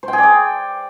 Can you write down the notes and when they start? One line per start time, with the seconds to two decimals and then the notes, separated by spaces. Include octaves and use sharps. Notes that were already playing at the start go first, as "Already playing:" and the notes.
0.03 C5
0.08 G5
0.13 G#4
0.18 D5
0.23 G5